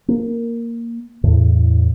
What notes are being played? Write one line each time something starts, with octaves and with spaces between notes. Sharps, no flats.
A#3
E2 A2